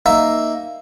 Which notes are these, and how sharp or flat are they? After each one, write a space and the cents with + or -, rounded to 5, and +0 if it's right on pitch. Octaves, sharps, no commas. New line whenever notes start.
A#3 +0 D#4 +0 E5 +0